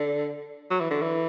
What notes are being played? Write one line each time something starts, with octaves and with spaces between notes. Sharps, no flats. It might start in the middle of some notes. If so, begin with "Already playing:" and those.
Already playing: D3
F#3
E3
D3
E3